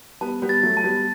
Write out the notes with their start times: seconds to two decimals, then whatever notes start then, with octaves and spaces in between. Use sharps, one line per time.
0.21 G3 B3 A5
0.42 G3 B3
0.49 A6
0.63 F#3 A3
0.77 A5
0.84 G3 B3